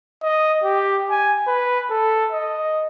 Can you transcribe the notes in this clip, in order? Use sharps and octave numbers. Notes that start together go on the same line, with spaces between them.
D#5
G4
G#5
B4
A4
D#5